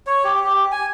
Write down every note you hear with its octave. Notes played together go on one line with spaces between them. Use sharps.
C#5
G4
G4
G#5